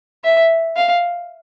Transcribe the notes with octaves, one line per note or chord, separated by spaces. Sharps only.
E5
F5